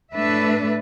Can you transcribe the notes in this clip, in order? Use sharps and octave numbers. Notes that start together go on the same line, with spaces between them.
A2 A3 D4 B4 E5